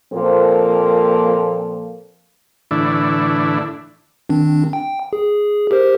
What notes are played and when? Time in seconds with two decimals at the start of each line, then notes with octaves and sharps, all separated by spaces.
0.13 A#2 F3 A#3 C4 A4
2.71 A2 D3 E3 D4 E4
4.29 D#3 C4 D4
4.73 G5
5.13 G#4
5.71 G4 A#4 C5